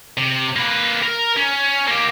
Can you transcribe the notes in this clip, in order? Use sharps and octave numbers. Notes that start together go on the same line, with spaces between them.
C3
A#3 B4
A#4
C#4
A#3 G4